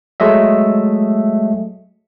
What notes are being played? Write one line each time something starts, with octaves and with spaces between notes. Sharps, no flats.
F#3 G#3 A3 D#5 E5